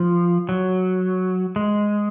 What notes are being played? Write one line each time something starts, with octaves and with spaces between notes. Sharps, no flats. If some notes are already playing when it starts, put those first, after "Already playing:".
Already playing: F3
F#3
G#3